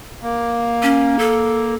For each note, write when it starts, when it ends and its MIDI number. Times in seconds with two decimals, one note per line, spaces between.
0.22 1.75 58
0.83 1.19 61
1.19 1.75 69